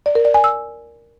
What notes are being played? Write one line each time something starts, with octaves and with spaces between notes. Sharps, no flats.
D5
A#4
D5
G#5
E6